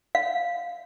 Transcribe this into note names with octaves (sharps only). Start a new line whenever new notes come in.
F5